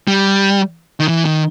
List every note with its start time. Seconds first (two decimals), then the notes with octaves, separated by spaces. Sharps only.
0.08 G3
1.00 D#3
1.08 E3
1.25 D#3